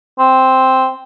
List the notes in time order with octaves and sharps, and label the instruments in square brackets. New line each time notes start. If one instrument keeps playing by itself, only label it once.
[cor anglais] C4